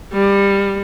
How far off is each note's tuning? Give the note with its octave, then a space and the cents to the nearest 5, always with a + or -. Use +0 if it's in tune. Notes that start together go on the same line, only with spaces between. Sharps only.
G3 +20